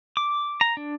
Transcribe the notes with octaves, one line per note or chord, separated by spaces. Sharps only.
D6
A#5
D4